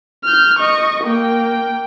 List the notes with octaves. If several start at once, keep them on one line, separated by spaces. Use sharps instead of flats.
F6 G6
D#5 C#6
A#3 G5